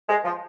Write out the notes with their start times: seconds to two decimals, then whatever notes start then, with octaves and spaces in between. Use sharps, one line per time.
0.09 G#3
0.25 F3